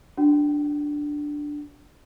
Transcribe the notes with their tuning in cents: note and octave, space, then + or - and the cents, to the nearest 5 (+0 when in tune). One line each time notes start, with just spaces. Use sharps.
D4 +0 F#4 +0 G5 -45